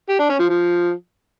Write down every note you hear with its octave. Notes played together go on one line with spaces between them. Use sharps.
G4
D4
C#4
F3
F3